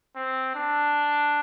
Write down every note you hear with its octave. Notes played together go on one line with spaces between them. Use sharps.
C4
D4